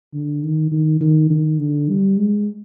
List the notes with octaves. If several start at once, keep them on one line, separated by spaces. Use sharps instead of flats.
D3
D#3
D#3
D#3
D#3
D3
G3
G#3